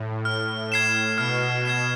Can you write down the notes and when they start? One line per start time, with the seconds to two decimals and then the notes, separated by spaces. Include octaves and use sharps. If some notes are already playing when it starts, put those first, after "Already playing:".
Already playing: A2
0.25 F6
0.72 G#6 C7 E7
1.18 B2 F6
1.49 B2
1.65 G#6 C7 E7